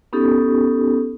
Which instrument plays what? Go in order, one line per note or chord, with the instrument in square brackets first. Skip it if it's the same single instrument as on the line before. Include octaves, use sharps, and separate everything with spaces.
[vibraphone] B3 C#4 D#4 G4 A4